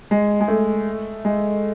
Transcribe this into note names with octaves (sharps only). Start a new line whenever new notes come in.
G#3
G#3
A3
G#3